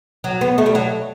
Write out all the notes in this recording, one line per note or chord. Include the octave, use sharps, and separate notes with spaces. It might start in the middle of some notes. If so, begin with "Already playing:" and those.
F#3
B3
A3
G3
F#3